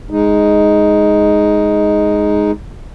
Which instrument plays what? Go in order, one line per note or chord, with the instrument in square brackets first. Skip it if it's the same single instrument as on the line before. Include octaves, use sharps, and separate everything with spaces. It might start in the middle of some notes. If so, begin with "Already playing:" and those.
[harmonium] G#3 D#4